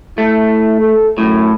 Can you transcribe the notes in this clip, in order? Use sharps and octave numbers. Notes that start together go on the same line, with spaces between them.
A3 E4
A4
F#2 A2